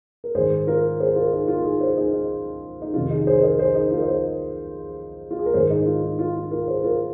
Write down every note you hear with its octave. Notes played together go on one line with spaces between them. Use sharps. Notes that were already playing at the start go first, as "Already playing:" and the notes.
A#4
G#2 D#3 G#4 C5
F4 A#4
G#4 C5
F4 A#4
D#4 G#4
F4
F4
D#4 G#4
G#4 C5
D#4 G#4
D#4
D#4
F2 C3 D#3 F4
D#4 G#4
G#4 C5
C5
A#4 D#5
G#4 C5
D#4 G#4
F4 A#4
D#5
G#4 C5
F4
G#4
A#4
G#2 D#3 G#4 C5
D#4 G#4
F4
D#4
F4
F4
F4 A#4
G#4 C5
F4 A#4